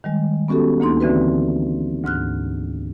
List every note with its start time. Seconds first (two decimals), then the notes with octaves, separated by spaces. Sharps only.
0.04 D#3 G3 G#3
0.48 B3 C#4 F#4 G4 A4
0.80 D2 A#3 D#4 C6
1.00 D3 E3 C4 F#4 B4
2.04 D2 G#2 F6 F#6